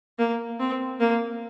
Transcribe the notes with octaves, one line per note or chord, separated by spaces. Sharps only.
A#3
C4
A#3